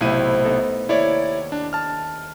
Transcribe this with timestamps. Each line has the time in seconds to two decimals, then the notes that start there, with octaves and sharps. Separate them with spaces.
0.01 B1 A2 C3 E4 D#7
0.45 B3 D#4 A4
0.89 D#2 E4 C#5 D5
1.52 D4
1.73 A5 F6